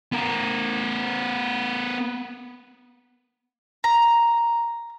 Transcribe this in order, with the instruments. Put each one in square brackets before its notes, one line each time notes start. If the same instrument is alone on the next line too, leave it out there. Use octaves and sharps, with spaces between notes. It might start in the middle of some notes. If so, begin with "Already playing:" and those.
[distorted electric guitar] B3 A#4
[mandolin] A#5